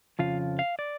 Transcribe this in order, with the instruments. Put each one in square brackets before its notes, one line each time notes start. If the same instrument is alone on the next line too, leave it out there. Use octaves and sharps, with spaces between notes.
[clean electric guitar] F2 C#3 F3 F4 F5
F5
D5